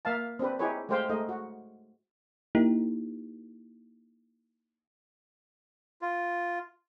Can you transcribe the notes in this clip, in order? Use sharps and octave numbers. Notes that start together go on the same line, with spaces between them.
A#3 E5 F5 A5
C4 D4 G4 B4
D#4 E4 G4 G#4 B4 C#5
G#3 A3 G4 C5 F5 G5
G#3 A3 D#4 D#5
F#4
A#3 D#4 E4 G4 A#4
F4